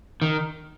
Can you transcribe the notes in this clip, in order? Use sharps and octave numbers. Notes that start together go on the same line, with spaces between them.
D#3